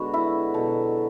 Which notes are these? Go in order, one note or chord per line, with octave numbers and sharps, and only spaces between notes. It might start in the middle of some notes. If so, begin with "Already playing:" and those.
Already playing: D3 G#3 B3 F#4
E4
B2 F#3 B3 A4